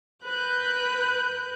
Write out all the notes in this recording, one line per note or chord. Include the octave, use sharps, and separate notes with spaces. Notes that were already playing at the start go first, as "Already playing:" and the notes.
A#4 B4 F#6 G6